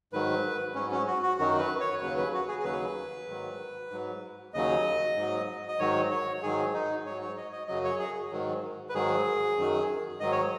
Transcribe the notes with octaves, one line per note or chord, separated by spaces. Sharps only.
G#2 D#3 F#3 B4
G#2 F#3 C#4
C#4
F#4
F#4
F#2 D#3 F#3 F#4
B4
C#5
D#2 C#3 F#3 B4
B4
F#4
G#4
G#4
D#2 C#3 F#3 B4
G#2 D#3 F#3
G#2 F#3
D#2 C#3 F#3 D#5
G#2 F#3
D#5
G#2 D#3 F#3 C#5
C#5
G#2 D#3 F#3 G#4
D#4
G#2 F#3 C#5
C#5
D#5
D#5
F#2 C#3 F#3 D#5
C#5
G#4
G#2 D#3 F#3
B4
G#2 D#3 F#3 G#4
F#2 D#3 F#3
G#2 D#3 F#3 D#5
C#5